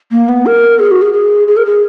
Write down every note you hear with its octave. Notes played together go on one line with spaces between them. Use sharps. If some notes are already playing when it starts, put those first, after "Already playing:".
A#3
B3
A#4
G#4
F#4
G#4
G#4
G#4
A#4
G#4